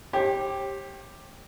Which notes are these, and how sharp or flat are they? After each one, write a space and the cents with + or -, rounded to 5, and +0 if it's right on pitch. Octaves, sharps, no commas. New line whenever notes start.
G4 +5 C#5 -45